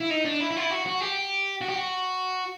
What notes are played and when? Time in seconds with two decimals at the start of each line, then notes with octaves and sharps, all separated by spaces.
0.01 E4
0.11 D#4
0.26 D4
0.41 E4
0.51 E4
0.56 F4
0.61 E4
0.71 F#4
0.86 F#4
1.01 G4
1.61 F#4
1.69 G4
1.76 F#4